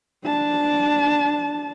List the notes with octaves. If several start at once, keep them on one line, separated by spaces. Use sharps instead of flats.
D4 A5